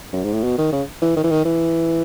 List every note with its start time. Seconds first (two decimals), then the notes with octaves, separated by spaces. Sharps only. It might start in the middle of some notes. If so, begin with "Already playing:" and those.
0.13 F#2
0.23 G#2
0.33 A2
0.43 B2
0.58 D#3
0.72 C#3
1.02 E3
1.16 D#3
1.24 E3
1.30 D#3
1.45 E3